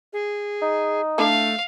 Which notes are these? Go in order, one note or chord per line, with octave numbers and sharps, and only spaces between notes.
G#4
D#4
A3 D4 E4 A4 F5